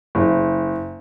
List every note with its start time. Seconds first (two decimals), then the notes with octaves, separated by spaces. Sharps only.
0.15 F#1